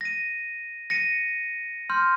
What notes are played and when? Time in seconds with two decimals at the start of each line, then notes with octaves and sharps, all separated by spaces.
0.01 A#6 D#7
0.90 A#6 C#7 D#7
1.90 C6 F6 G6